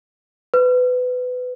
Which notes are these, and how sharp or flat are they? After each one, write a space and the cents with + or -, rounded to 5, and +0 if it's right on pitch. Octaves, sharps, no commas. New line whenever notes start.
B4 +20